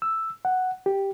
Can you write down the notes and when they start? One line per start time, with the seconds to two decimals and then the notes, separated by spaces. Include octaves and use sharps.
0.02 E6
0.45 F#5
0.86 G4